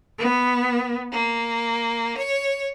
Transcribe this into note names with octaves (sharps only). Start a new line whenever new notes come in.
B3
A#3
C#5